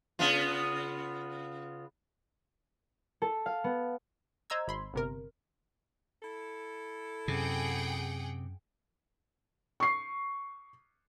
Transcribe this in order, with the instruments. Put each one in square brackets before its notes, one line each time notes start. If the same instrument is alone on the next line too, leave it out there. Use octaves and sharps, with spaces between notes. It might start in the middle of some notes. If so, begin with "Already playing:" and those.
[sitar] C#3 B3 F4
[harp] A4
F5
B3
[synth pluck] C5 D#5 A#5 E6 G#6
G#1 B5 C6
G1 C3 A#4
[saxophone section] E4 A4
[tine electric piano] F#2 [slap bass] C3 [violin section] G#4 F#5 G5
[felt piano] C#6 C7